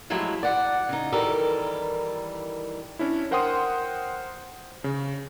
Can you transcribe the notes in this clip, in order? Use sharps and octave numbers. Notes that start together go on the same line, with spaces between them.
F3 F#3 G#3 A3 E4 G4
D5 F#5
C#3 D#4
D#3 E3 G3 A4 A#4
C#4 D4 E4
A#4 C5 F#5 G5 C6 D#6
C#3